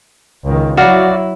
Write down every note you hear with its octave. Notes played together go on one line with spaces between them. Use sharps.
C#2 D#3
F#3 E4 F#4 D5 F5